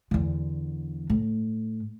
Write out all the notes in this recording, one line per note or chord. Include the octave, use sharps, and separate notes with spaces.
E2 D3
A2